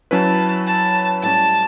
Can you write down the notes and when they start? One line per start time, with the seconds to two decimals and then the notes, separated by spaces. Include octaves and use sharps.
0.11 F#3 C#4 E4 B4 A5
0.67 A5
1.23 A2 G3 C#4 A5